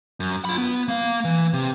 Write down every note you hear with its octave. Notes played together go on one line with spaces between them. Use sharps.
F#2
F4 B5
B3
A#3 F5
E3
C3